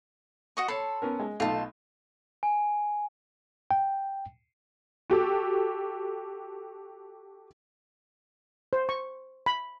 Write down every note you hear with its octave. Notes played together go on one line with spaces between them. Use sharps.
F#4 D#5 C#6
A4 C#5 A5 B5 C6
B3 C#4 A#4
G#3
B1 A3 D#4 F4 A5
G#5
G5
F#4 G4 A4
C5
C#6
B5